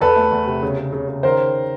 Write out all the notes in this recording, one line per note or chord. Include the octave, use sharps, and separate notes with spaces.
E2 A4 B4
A3
E2
C3
C#3
C#3
C#3
C#3
D#3 A#4 C5